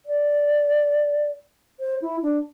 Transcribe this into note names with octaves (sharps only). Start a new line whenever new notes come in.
D5
C5
E4
D4